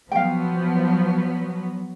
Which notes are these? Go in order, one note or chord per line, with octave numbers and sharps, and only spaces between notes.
F3 F#3 B3 F5 G5